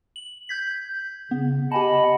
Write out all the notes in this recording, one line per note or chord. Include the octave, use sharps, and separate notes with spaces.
F#7
G6 G#6 B6
C#3 B3
G4 D#5 F#5 G#5 A5 B5